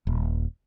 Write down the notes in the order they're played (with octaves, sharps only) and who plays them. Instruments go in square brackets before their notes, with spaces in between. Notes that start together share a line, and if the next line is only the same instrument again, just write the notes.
[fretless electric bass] D#1